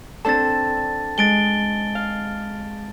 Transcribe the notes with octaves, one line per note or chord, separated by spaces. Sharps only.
C4 D4 A4 A5 A6
G#3 A6 D7 G7
F5